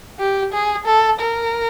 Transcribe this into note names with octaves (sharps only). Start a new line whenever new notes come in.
G4
G#4
A4
A#4